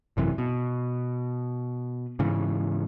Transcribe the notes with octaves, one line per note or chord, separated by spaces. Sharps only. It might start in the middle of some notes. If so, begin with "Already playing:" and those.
G#1 F#2 C3 E3
B2
G#2 C#3 E3